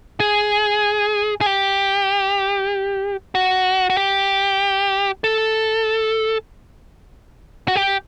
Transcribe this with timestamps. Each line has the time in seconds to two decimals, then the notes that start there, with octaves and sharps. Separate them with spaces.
0.20 G#4
1.41 G#4
1.46 G4
3.35 F#4
3.90 F#4
3.97 G4
5.24 A4
7.68 F#4
7.76 G4